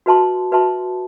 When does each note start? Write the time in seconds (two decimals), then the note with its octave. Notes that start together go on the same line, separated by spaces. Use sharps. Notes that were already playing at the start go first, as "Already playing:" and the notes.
0.06 F#4 B4 E5 A5 C6
0.52 F#4 B4 E5 A5 C6